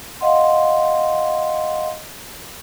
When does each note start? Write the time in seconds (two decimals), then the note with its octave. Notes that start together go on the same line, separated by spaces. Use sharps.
0.20 D#5 F5 F#5 C6